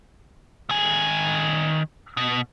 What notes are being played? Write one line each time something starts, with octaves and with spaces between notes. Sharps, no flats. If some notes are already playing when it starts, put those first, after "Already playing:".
D#3 G#5
B2